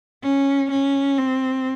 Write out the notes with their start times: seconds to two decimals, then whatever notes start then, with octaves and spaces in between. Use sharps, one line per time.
0.23 C#4
0.71 C#4
1.18 C4